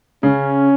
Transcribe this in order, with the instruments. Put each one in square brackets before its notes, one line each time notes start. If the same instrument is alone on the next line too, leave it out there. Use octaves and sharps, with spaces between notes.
[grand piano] C#3 [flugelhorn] C#4